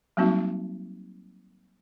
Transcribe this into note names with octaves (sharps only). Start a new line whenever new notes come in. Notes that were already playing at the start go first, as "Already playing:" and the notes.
F#3 G3 A#3 C4 D#4 F#4